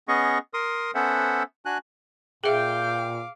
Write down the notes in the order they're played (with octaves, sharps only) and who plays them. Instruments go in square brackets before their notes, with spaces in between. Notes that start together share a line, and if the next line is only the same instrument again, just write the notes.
[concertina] B3 C#4 G#4 D#5 C#6
A#4 C6 D#6
B3 C#4 A4 C5 E5 F#5
D4 F#4 G#5 F#6
[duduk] A#2 [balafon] G#4 E5 [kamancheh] F5 D6 [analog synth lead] G5